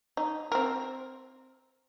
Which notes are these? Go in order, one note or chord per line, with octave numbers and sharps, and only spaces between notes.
D#4
C4 A#4